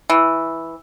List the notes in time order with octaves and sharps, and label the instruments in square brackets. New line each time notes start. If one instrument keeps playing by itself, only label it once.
[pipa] E3